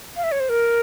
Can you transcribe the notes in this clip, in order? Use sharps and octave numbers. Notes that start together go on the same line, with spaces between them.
F5
E5
C#5
C5
A#4